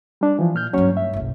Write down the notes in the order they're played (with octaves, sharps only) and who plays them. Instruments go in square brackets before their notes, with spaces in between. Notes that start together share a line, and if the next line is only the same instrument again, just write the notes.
[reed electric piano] G3 D4
E3 F3
A#2 F6 G6
[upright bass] F#1 G2 [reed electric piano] F#3 C#4 C#5
[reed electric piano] E5
[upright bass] F#1 B1